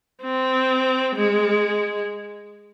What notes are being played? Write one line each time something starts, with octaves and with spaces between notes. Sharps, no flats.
C4
G#3